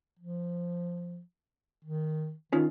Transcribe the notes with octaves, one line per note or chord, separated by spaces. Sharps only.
F3
D#3
D#3 C#4 D#4 F4